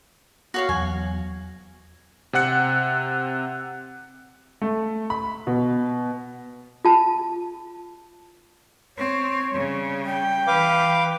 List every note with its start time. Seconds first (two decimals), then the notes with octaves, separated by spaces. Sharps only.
0.54 F#4 C#5 F5
0.69 E2 F#3 G#5
2.33 C3 C4 F#5 F#6 C#7
4.62 A3
5.10 B5
5.47 B2
6.85 F4 A5
8.97 C4 C#5
9.51 C#3 G3
10.05 G5
10.47 E3 B4 F5 D6